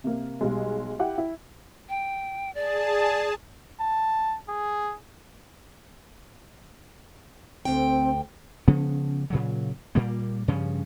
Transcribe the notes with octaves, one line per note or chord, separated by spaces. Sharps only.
C3 A#3
B1 G3 G#3
E4 G4 F#5 G5
E4
G5
G#4 D5 A5
A5
G#4
D2 C4 G5
C#3 F3 B3 C#4
A#2 C#3 F#3
A#2 G3 A#3
G2 C#3 F3 C#4